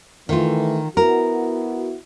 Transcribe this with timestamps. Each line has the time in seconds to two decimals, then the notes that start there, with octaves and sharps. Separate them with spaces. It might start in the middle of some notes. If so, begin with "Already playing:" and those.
0.29 D#3 E3 A3 F4
0.97 B3 E4 F#4 A#4